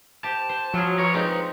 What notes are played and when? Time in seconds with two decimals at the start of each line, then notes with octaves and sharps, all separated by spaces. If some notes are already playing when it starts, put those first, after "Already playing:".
0.24 G4 C5 A5
0.49 C5
0.74 F3 F#3 F4 G#4
0.99 B4 C#5 A#5
1.14 A#2 G#3 C4 D#4